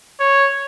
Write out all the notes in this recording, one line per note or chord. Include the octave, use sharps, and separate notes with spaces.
C#5